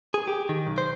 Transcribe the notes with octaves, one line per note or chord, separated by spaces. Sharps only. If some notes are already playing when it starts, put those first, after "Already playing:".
G#4
G4
D#3
B1
C5